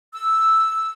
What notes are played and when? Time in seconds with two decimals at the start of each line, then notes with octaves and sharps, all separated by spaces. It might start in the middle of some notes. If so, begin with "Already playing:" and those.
0.13 E6